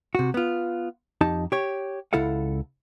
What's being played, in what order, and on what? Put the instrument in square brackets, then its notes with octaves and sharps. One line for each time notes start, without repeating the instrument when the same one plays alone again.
[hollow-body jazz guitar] C3 F#4
B3 F4
F2 D#4 G4 A5
G4 C#5
C#2 E4 A4 F5 F#5